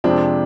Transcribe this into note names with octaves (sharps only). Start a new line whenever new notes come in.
F2 C3 F3 G#3 C4 D4